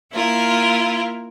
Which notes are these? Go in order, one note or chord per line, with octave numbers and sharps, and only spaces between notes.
A#3 E4 F4 A#4